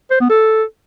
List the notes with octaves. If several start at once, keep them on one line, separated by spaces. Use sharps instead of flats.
C5
B3
A4